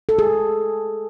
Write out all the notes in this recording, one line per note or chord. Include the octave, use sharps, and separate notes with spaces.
A4
G#4